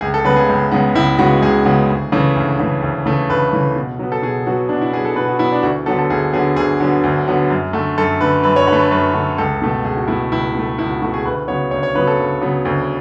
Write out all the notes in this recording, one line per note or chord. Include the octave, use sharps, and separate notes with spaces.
C#2 G#4
A4
C#3 G#3 B3 B4
G#4
C#2
C#3 G#3 B3
C#2 E4
C#3 G#3 B3 F#4
C#2 G#4
C#3 G#3 B3
D2
C#3 E3 A3
D2
C#3 E3 A3
D2
C#3 E3 A3
D2 B4
C#3 E3 A3
B2
F#3 B3
A4
B2 G#4
F#3 B3 F#4
B2 D4
E4
F#3 B3 G#4
A4
B2 B4
F#4
F#3 B3 E4
D4
D2 F#4
D3 F#3 B3 A4
A4
D2 G#4
D3 F#3 B3 G#4
D2 G#4
D3 F#3 B3
D2
D3 F#3 B3
F#2
D3 A3
F#2 A4
D3 A3 B4
F#2 B4
C#5
D3 B4
A3
B4
F#2 B4
D3 A3
C#2 A4
B2 A3
C#2 G#4
F#4
B2 A3 E4
C#2 E4
B2 A3
C#2 E4
F#4
B2 A3 F#4
G#4
D2 B4
C#3 F#3 B3 C#5
D2 C#5
C#5
C#3 F#3 B3 B4
A4
D2
C#3 F#3 B3
D2